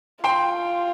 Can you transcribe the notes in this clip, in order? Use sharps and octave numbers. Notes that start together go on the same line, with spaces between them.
F4 G5 C6